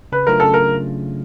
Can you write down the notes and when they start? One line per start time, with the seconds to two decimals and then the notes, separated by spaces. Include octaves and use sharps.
0.12 C#3 B4
0.27 F#3 A3 D4 F4 A#4
0.40 C#3 A4
0.54 A#4